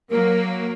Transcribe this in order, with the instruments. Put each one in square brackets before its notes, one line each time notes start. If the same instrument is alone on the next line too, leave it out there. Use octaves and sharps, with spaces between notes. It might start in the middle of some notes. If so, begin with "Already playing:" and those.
[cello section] F#3 A#3 [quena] A#4